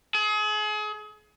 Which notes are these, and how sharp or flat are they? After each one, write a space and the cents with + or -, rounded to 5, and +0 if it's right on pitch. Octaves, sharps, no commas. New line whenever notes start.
G#4 +35